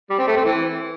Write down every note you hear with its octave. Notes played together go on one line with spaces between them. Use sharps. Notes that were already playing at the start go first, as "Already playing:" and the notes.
G3
C4
A3
C4
E3